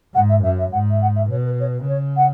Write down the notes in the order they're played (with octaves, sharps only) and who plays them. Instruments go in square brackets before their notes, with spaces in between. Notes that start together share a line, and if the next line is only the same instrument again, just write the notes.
[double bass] G#2 [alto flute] F#5
[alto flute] E5
[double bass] F#2 [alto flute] E5
[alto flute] E5
[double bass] G#2 [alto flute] F#5
[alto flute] E5
F#5
E5
[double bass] B2 [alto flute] C#5
[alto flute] B4
C#5
B4
[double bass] C#3 [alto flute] C#5
[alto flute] F#5